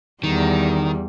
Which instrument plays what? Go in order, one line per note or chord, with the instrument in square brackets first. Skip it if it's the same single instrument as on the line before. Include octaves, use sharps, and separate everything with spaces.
[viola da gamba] E2 G3 [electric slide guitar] D#3